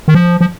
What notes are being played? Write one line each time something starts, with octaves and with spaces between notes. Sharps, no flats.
D#3
F3
F3